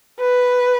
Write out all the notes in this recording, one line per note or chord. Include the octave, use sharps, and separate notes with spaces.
B4